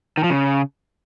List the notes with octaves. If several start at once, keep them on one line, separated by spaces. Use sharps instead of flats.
D#3
F3
C#3